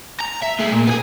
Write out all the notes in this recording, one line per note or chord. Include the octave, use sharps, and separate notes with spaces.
A#5
E5
A3 G#4
A#2
B3 G#4